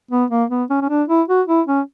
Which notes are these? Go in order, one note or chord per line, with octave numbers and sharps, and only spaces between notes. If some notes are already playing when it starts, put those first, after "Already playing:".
B3
A#3
B3
C#4
C#4
D4
E4
F#4
E4
C#4